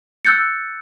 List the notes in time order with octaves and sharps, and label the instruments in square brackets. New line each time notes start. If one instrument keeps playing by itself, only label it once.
[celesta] E6 F#6 G6 A6 C#7